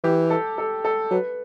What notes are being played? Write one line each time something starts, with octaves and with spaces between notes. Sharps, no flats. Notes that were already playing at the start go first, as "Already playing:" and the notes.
E3 G4
A4
A4
A4
F#3 B4